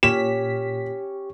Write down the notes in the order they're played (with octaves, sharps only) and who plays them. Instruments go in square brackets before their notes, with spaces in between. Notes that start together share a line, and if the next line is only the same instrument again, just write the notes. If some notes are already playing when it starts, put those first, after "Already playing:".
[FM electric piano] A#2 B6 [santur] C#4 [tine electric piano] G4 [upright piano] E7